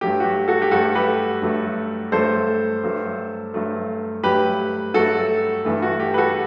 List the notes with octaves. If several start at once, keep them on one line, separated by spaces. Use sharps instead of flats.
G2 F#3 A3 G4
F#4
G4
F#4 A4
G4
G2 F#3 A3 F#4 A4
G4 B4
G2 F#3 A3
G2 F#3 A3 A4 C5
G2 F#3 A3
G2 F#3 A3
G2 F#3 A3 G4 B4
G2 F#3 A3 F#4 A4
G2 E3 A3
F#4
G4
B4
F#4 A4